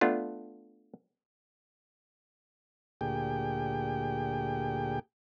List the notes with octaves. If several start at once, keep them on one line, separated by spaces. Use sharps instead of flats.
A3 B3 D4 F4
D2 A#2 G4 G#4 G5